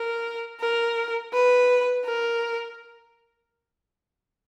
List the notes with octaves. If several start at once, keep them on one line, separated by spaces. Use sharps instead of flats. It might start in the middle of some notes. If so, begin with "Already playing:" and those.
Already playing: A#4
A#4
B4
A#4